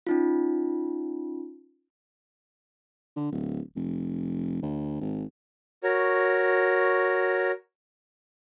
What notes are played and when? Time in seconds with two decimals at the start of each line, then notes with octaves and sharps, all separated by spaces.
0.07 C#4 D#4 F4
3.16 D3
3.32 D1
3.76 F1
4.63 D2
5.01 G#1
5.83 F#4 A#4 C#5